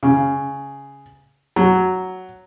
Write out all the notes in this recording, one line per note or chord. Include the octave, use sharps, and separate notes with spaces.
C#3
F#3